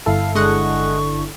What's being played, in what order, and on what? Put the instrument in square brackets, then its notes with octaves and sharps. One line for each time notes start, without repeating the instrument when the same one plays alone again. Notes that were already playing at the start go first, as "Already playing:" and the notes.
[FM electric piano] G1 E4 A4 [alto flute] F5
[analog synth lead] D3 [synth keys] G#3 D#5 F#5 [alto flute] C#6